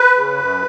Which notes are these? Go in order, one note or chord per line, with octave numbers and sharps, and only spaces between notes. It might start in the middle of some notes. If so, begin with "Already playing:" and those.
Already playing: B4
C#3
F#2